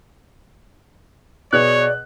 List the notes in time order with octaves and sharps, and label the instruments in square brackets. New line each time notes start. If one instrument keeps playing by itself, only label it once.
[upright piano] B2 G#4 F#6 [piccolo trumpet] C#5 [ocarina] D5